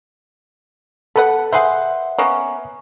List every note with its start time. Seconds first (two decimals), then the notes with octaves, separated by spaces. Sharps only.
1.16 B3 A4 B4 F#5
1.52 G#4 B4 C5 E5 F#5
2.18 A#3 B3 C#4